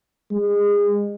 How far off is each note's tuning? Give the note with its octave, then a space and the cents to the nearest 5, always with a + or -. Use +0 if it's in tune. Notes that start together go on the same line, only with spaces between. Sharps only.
G#3 -30